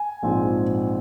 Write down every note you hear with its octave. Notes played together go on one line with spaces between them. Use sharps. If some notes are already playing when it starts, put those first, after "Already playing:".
Already playing: G#5
A#1 G#2 F3 C4